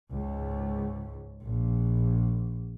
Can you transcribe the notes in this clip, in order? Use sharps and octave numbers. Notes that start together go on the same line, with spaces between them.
C#2 G#2
A#1